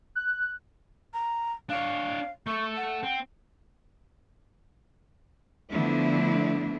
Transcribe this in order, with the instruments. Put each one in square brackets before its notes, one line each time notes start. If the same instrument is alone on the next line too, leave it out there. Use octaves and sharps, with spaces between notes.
[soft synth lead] F#6
[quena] A#5
[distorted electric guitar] D4 C#5 [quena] F5
[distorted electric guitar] A3 A4 [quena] C#6
[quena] F#5
[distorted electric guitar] C4
[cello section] D3 F3 A3 B3 D4 E4